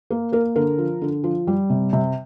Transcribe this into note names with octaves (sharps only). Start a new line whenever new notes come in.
A#3
A#3 A#4
D3 A#4
F3
D3
F3
G3
C3
C3